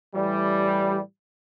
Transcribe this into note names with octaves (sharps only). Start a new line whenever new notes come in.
A2 E3 G3